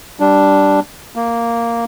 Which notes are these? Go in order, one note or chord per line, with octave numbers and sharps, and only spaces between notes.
G3 D4
A#3